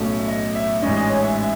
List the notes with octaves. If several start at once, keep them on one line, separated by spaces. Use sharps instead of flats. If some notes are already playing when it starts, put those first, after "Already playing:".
Already playing: B1 A2 F#3 A3 C#4
E5
D#5
E5
A1 G#2 E3 G#3 C#4 D#5
D#5
C#5
E5
E5